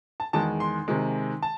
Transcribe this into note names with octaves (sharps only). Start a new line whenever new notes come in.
A5
E2 D#3 G#3 A5
C6
C3 D#3 G#3
A5